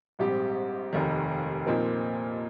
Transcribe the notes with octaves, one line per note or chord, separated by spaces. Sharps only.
A#1 G#2 G3 C4 G4
F1 D#2 D#3
A#2 F3 C4 D#4 A#4